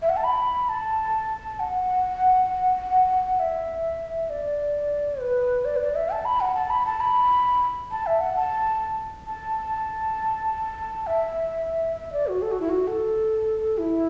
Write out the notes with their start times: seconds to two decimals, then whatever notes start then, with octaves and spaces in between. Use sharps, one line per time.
0.02 E5
0.09 F#5
0.16 A5
0.24 B5
0.69 A5
1.60 F#5
3.39 E5
4.30 D5
5.21 B4
5.65 D5
5.76 B4
5.81 D5
5.95 E5
6.10 A5
6.25 B5
6.40 F#5
6.55 A5
6.70 B5
6.86 A5
7.00 B5
7.91 A5
8.06 E5
8.20 F#5
8.36 A5
9.26 A5
11.07 E5
11.96 E5
12.12 D5
12.27 F#4
12.42 A4
12.52 F#4
12.60 E4
12.69 F#4
12.87 A4
13.78 E4